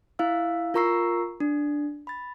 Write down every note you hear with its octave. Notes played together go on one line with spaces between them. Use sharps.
E4 F5 E6
F4 A#4 A#5 C#6 E6 C7
D4
B5 A6